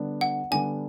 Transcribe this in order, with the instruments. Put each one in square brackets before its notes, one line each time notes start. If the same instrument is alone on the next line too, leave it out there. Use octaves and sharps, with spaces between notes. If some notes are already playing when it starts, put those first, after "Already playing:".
Already playing: [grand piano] D3 G3 B3 D4
[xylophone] F#5
[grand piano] D3 G3 B3 D4 [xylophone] G#5